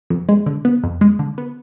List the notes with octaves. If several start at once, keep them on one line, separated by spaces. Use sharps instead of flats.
F2
G#3
D3
B3
F2
G#3
D3
B3